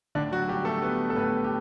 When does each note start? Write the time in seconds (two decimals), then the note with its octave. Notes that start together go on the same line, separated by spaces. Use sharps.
0.15 A2 D3 D4
0.32 F#3 F#4
0.48 G3 G4
0.65 A3 A4
0.82 G3 B3 B4
1.10 A4
1.16 A2 B3 B4
1.44 G4